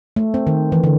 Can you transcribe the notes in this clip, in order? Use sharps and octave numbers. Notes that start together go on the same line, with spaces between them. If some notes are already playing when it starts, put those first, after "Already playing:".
A3
C4
D#3
E3
D3